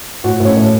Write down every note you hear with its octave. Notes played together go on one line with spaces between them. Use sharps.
A2 F#4 F#5
A2
C#4 C#5
A2